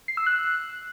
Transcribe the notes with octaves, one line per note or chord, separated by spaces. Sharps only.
C7
E6
F#6